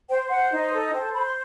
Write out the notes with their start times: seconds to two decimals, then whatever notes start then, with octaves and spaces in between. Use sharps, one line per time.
0.08 C5 G5
0.29 C5 F#5
0.51 D#4
0.72 A4
0.92 C5 G5
1.03 A5
1.13 C5 B5
1.24 C6